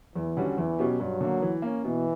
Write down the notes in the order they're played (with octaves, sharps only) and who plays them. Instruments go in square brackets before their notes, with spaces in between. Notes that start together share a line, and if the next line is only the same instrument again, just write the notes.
[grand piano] E2 [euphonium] E3
[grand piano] D3 G3 C#4 F#4
[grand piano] E2 [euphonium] E3
[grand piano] B2 F#3 C#4 G4
[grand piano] G2 [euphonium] F#3
[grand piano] D3 A#3
E3
A#3 C#4
[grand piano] B2 [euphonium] E3